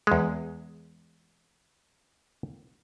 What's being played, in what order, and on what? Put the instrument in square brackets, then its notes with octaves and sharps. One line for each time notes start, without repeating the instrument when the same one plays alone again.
[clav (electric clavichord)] E2 G#3